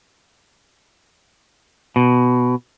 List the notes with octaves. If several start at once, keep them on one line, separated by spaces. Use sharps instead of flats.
B2